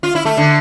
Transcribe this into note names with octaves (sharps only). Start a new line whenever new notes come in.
F4
E4
A3
D3